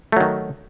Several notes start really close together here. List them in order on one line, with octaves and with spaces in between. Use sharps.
A3 F#3 D#3